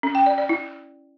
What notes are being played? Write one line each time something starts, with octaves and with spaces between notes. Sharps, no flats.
C#4
G5
D5
D5
E4